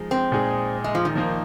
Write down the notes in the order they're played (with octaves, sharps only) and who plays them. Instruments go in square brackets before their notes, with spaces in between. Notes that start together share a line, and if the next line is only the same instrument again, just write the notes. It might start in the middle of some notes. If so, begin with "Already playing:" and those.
Already playing: [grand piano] F3 G#3 D#4
[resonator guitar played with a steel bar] C4
[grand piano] A#2 G#3 D#4 G#4
[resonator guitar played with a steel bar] G#3
F3
D#3
[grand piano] F3 A#3 D#4 C5